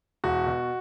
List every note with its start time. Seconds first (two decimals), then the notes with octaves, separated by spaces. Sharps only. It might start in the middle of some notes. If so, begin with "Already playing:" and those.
0.24 E1 F#4
0.47 B2